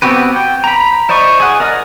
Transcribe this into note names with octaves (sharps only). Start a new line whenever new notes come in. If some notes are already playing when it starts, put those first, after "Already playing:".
B3 C4 F#4 G4 B4
G5
A#5 B5
E4 C5 D5 D#5 C#6
G#4 F#5
A#4 D5 D#5 D#6 F6